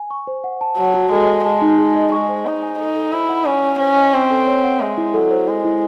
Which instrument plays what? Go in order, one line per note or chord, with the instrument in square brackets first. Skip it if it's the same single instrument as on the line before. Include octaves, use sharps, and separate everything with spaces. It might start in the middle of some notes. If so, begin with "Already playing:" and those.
Already playing: [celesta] G#5
C#6
C5
F#5
A5
[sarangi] F#3 [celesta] A5
[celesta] F#4
[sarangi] G#3 [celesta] A4
[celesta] D#5
[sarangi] G#3 [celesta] A5
[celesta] D#4
G#4
D#5
[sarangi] G#3 [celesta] C#6
[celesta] C5
[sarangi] D#4 [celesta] D#5
[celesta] G#5
[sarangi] D#4 [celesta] A4
[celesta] A4
[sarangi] E4 [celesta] C5
[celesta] F#5
[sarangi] C#4 [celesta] G#5
[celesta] E4
[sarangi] C#4 [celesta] C5
[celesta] D#5
[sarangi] C4 [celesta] C#6
[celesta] A4
C#5
F#5
[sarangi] G#3 [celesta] E5
[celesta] E4
[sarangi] F#3 [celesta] A4
[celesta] C5
[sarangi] G#3 [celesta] E4
[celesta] E4